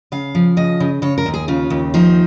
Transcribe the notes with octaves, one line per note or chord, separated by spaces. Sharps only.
C#3 F5
F3
C#3 D#5
C#3
C#3 C#5
A#4
D#2
G#4
C#3 F4
D#2
F3 D#4